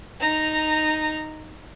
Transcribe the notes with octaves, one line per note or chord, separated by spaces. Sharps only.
D#4 A#5